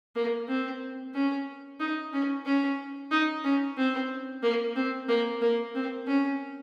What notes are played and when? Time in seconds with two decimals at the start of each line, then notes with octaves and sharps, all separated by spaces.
0.16 A#3
0.49 C4
1.14 C#4
1.80 D#4
2.13 C#4
2.46 C#4
3.12 D#4
3.44 C#4
3.77 C4
4.43 A#3
4.76 C4
5.09 A#3
5.42 A#3
5.75 C4
6.07 C#4